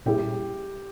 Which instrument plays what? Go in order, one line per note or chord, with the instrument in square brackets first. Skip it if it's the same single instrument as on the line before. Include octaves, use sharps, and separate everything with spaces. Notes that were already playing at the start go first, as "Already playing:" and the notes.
[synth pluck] A#2 G3 C#4 E4 G#4 [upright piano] G4